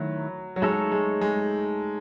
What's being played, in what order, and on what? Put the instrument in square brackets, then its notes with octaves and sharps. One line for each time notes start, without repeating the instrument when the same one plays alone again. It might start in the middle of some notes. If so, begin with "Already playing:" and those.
Already playing: [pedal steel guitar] D#3 A3 E4 B4 [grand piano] F#3
[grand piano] F#3
[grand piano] G#3 [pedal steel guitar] A3 D#4 A4 C#5
[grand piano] G#3
G#3